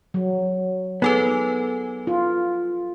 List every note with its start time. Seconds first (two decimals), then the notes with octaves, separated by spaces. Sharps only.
0.14 F#3
1.02 B3 D#4 G#4 A4 B4
2.07 F4